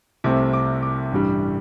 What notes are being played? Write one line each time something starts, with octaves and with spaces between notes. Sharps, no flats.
C2 C3 A3 C4 D6
D6
D6
A1 G2 G3